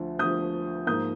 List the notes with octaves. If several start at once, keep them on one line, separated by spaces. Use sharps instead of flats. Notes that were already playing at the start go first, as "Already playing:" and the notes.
Already playing: D2 D3 F3
D2 D3 F3 D#6 G6
G#2 F3 A#3 D#6 G6